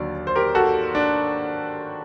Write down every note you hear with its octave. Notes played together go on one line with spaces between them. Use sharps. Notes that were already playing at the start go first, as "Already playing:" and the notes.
Already playing: D#2 D3 F#3 D5
C5
G4 A#4
F#4 A4
D4